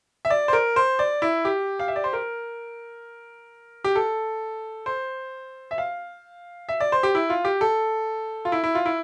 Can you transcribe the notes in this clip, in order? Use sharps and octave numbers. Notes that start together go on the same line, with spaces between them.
E5
D5
C5
A#4
C5
D5
E4
G4
F5
E5
D5
C5
A#4
G4
A4
C5
E5
F5
E5
D5
C5
G4
E4
F4
G4
A4
F4
E4
E4
F4
E4